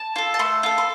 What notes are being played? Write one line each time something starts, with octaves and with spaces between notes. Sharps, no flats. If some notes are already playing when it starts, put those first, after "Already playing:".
Already playing: A5
F4 A4
A5
A3 C6
F4 A4
C6